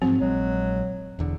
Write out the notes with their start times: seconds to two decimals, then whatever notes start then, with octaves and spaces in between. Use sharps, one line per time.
0.02 G#2 F3 F#3 C4
0.20 A#1 F#3 G#3
1.19 E1 E2 D3